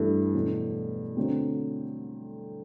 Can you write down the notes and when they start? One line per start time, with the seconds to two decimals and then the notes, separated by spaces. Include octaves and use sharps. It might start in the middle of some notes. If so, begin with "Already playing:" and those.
Already playing: G2 E3 A3 E4 A4
0.35 E2 B2 F#3 A3
1.17 D3 F#3 A3 C4